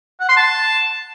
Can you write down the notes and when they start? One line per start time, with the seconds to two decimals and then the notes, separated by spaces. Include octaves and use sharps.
0.20 F#5
0.29 C6
0.37 A5